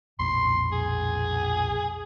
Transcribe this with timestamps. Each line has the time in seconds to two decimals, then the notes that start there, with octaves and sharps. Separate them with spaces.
0.19 B1 F2 A#2 C6
0.72 G#4